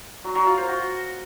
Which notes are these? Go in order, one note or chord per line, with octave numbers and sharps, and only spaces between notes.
F#3
F#3
F4
C5
F#4